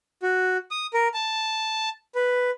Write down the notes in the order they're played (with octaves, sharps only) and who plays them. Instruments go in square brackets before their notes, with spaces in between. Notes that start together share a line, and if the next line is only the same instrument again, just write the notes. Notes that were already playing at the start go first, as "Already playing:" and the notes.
[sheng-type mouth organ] F#4
D#6
A#4
A5
B4